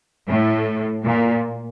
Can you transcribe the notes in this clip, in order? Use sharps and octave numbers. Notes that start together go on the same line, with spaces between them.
A2
A#2